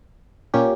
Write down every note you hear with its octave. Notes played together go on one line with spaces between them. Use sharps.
A#2 A#3 C#4 G4